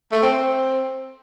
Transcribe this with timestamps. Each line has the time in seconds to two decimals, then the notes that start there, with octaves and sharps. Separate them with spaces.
0.12 A3
0.23 C4
0.33 C4